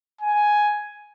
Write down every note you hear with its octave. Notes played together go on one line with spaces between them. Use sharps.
G#5